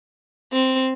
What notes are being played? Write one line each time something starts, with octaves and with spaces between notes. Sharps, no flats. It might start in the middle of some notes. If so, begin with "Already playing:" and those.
C4